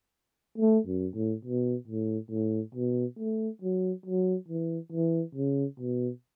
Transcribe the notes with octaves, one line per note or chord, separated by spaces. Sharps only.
A3
F#2
A2
B2
A2
A2
B2
A3
F#3
F#3
E3
E3
C#3
B2